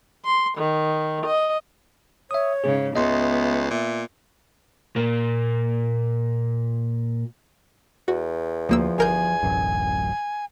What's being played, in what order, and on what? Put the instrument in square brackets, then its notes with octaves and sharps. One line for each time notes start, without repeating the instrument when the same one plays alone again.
[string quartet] C6
D#3
D#5
[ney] C#5 [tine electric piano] E5 D#6
[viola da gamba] G#2 C#3 [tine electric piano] G#4
[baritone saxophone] C#2 [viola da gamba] B3 [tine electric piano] D#5 C6 [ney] E5
[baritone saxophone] A#2 [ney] E5
[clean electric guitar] A#2 A#3
[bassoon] E2 [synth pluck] F#4
[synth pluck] D2 A#3 E6 [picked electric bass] F3
[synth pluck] G1 A#4 G6 [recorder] G#5
[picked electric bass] D1 A1 F#2